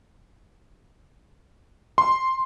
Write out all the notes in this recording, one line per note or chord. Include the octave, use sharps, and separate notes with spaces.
C6